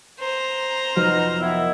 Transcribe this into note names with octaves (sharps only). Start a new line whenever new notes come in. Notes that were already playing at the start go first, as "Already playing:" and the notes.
C5 A#5
F1 B2 F3 F#3 D#4 F6
D#3 B3 E4